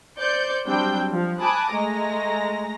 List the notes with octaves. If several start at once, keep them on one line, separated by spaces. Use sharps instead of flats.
C5 D5 G6 C#7
F#3 G3 C4 D4 G5 G6
F3
G#5 A5 B5 D6 D#6 F#6
G#3 A3 A#5 A#6